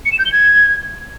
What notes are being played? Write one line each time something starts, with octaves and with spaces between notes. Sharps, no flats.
C#7
E7
G6
G7
G#6